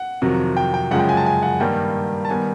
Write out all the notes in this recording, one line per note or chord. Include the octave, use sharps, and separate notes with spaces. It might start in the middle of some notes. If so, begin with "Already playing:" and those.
Already playing: F#5
F2 C3 D#3 F#3
G5
G5
F#2 C#3 F3 G#3 F#5
G5
G#5
A5
G#5
F#5
G2 D#3 G3 A#3 G5
A5
D#3 G3 B3 G#5